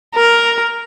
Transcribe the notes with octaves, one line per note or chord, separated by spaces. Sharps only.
A#4